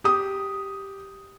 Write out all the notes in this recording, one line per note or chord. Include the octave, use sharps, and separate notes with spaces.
G4 D#6